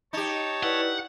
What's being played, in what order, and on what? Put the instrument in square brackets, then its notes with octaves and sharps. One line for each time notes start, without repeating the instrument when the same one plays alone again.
[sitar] D#4 G4 [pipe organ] C#5 A5
[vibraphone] E4 B4 D5 [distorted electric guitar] F#5